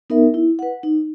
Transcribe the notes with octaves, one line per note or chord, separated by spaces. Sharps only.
B3 D#4 A#4 E5
E4
B4 F#5
D#4